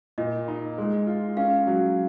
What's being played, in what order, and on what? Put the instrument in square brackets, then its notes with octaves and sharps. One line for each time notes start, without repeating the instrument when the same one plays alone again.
[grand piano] A#2 [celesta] D#5
[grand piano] D#4
G#3
F4
[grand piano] C#4 [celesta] F5
[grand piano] F#3